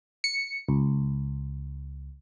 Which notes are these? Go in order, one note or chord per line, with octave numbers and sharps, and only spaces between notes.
C#7
C#2